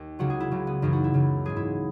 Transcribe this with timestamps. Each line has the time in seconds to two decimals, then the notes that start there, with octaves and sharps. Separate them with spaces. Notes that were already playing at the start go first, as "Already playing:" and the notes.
Already playing: D#2
0.19 C#2 C#3 F#3 F#4
0.30 G#4
0.40 E4
0.51 C#2 C#3 F#3
0.67 B3
0.82 F#2 C#3 E3 D#4
0.93 F#4
1.04 E4
1.14 F#2 C#3 E3
1.45 G#2 F#3 G#4
1.56 E4